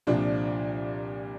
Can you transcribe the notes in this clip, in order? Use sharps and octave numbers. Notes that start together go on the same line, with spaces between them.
C2 A#2 F3 D4